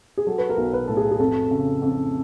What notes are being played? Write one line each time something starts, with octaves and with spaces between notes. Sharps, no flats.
G#4
F#3 A4
B4
A#4
B1
B4
A2 A4
G#4
G#4
F2 A4
C#3
F2